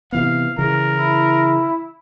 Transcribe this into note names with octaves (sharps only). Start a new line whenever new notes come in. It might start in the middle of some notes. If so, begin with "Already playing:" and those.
C3 E3 B3 F5
C#3 E3 A#4
E4